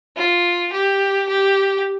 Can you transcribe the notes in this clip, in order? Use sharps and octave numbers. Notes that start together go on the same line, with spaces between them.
F4
G4
G4